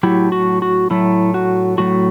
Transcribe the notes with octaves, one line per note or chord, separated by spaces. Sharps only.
A2 F#3 A3 E4 G4
F#4
F#4
A2 F#3 A3 E4
F#4
A2 F#3 A3 F#4